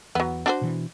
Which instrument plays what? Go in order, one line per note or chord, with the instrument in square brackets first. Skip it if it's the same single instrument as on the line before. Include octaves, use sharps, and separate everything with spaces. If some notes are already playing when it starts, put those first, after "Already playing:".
[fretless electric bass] E2 [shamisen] F#3 B3
[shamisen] D4 F#4 C5
[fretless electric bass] B2 E3